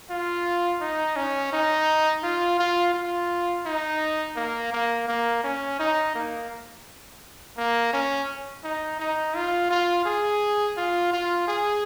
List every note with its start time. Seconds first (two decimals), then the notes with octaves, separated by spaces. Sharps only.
0.10 F4
0.81 D#4
1.16 C#4
1.53 D#4
2.23 F4
2.59 F4
2.94 F4
3.66 D#4
4.36 A#3
4.73 A#3
5.08 A#3
5.44 C#4
5.80 D#4
6.15 A#3
7.58 A#3
7.93 C#4
8.64 D#4
8.99 D#4
9.35 F4
9.71 F4
10.06 G#4
10.77 F4
11.13 F4
11.48 G#4